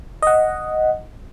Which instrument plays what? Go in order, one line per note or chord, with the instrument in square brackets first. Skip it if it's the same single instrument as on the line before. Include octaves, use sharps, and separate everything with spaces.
[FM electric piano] D#5 F#5